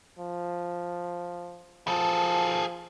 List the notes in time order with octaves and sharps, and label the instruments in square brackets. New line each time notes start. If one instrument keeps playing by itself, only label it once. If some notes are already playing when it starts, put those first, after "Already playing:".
[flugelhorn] F3
[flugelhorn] F3 [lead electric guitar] G#4 A4